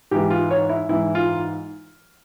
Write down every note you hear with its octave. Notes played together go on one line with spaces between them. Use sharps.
G#2 E3 G4
F4
C#5
E4
G#2 E3 E4
F4